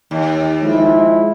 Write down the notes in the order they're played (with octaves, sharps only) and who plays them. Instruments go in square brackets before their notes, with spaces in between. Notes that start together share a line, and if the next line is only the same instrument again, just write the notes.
[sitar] D#2
[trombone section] F3 G#3 E4